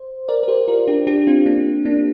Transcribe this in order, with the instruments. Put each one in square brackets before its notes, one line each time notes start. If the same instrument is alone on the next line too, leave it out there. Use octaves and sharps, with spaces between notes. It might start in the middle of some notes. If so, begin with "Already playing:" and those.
Already playing: [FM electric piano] C5
A#4 D5
A#4
G4 C5
F4 A#4
D4 G4
D4 G4
C4 F4
A#3 D4
A#3 D4